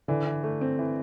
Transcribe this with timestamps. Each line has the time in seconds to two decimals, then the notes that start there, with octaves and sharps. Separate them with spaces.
0.08 D3 E3
0.26 E3
0.44 A3
0.61 C4
0.79 E3